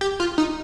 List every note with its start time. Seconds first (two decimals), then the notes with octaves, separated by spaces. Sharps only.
0.01 G4
0.20 F4
0.38 D#4